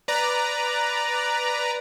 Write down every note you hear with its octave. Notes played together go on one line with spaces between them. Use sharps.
B4 D5 A#5